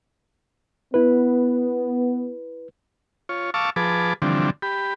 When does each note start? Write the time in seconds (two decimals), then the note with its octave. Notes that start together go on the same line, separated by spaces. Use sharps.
0.94 B3 E4 B4
3.29 F4 C#5
3.54 F5 A5 C#6 D6 E6
3.76 F3 G#4 B4 A5 D6
4.22 D3 E3 F3 G3 C4 D4
4.62 G4 B5